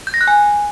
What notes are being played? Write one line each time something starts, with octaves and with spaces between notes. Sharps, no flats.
G6
A#6
F#6
G#5